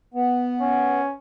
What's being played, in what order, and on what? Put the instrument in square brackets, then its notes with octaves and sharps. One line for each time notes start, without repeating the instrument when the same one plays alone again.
[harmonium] B3
[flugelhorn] C#4